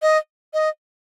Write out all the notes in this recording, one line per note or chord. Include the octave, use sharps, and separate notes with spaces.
D#5
D#5